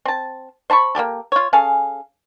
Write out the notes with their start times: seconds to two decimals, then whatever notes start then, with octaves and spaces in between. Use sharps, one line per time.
0.05 C4 A5
0.70 C5 A5 B5 C#6
0.95 A#3 B3 G4 A4
1.32 F4 C#5
1.53 C#4 G#4 A4 F5